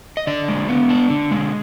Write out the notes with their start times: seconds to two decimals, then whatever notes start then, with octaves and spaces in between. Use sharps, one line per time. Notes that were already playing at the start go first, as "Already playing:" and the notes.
0.17 D#5
0.27 D3 D5
0.48 G#3
0.69 B3
0.89 D4
1.10 D3
1.31 G#3